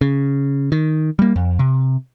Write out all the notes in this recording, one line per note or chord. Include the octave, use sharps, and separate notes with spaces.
C#3
D#3
G3 A#3
F2
C3